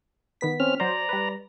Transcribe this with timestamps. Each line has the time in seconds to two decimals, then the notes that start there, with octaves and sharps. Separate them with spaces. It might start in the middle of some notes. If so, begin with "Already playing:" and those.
0.41 D#3 B3 B6
0.60 C4 C#4 F6
0.80 F#3 C5 D5 A#5
1.09 G3 B4